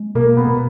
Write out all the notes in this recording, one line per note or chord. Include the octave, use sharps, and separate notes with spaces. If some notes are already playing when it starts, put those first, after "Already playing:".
Already playing: G#3
B2 A#3
B3
B2